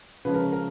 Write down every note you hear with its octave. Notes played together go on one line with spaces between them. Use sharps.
C#3 F3 G#3 C#4 B4
A#4
A#4